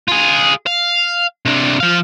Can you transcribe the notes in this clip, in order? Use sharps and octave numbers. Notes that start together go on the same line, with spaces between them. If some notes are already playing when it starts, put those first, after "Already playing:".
F4 G#4
F5
C3 D4
F3 F5